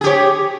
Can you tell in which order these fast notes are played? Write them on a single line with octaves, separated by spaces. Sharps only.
G#4 G4 C#5